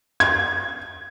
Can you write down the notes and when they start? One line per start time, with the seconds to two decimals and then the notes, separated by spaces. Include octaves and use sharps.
0.20 G#6